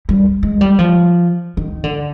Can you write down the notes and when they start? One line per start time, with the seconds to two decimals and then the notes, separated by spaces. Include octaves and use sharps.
0.09 G3
0.43 G#3
0.61 G3
0.79 F3
1.57 D#3
1.84 D3